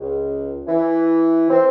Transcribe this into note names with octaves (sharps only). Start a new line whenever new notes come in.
C#2
E3
C4